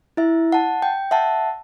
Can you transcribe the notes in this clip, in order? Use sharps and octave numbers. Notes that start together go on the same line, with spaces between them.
E4 E5
F#5 A5
G5
E5 F#5 A5